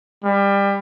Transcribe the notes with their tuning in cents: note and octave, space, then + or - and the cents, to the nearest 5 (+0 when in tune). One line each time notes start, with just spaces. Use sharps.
G3 +25